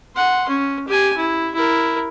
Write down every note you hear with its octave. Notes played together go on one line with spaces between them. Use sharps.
F#5 C6
C#4
G4 G#5
E4
E4 A#4